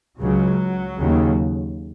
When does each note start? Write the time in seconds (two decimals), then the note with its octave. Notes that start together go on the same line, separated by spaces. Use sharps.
0.19 C#2 C#3 F#3
0.98 D#2 C#3